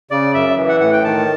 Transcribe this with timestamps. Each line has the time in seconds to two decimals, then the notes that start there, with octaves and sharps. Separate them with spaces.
0.11 C#3 D5
0.34 F#2 E5
0.57 E3
0.69 F#5
0.80 A2 F#5
0.93 G5
1.04 D#3 A5